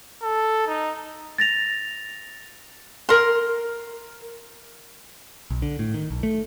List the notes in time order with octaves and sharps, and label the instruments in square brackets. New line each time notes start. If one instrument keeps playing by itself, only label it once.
[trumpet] A4
D#4
[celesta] A6 A#6 F7
[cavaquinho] A#4 C6
[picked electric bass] B1
D3
A2
D#3
B1
A3